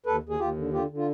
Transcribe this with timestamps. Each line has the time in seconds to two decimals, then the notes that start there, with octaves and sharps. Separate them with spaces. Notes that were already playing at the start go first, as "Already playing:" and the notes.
0.06 D#2 A4 B4
0.23 D#2
0.29 G#4
0.39 D#2 F4 G4
0.56 D3
0.73 D3 F4 G4
0.90 D3
0.97 F4